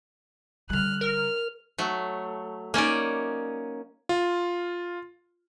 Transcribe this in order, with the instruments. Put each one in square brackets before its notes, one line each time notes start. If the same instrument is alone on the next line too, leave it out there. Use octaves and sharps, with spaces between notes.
[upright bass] D3 G3 [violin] F6 F#6
[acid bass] A#4 [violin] F6
[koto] F#3 A3
A#3 C#4 D#4 D5
[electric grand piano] F4